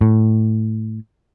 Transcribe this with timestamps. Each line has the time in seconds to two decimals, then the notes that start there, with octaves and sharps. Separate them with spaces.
0.01 A2